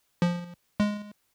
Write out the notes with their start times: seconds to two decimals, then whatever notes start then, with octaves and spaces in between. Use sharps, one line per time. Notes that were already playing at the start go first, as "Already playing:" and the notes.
0.22 F3
0.80 G#3